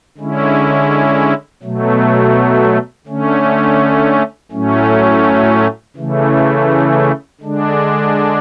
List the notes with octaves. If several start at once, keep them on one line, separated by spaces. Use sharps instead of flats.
D3 G#3 C#4 E4
B2 F#3 A3
D3 A3 C#4
A2 F#3 A3 C#4
C#3 E3 A3
D3 G#3 D4